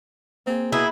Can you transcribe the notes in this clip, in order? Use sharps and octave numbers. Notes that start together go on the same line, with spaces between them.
A#3 C4 G#4
B2 E4 G#4 B4 F#5 A#5